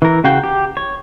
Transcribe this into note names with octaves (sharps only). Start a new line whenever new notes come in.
E3 A#4
C#3 F#4 F5 G5
G4
C#5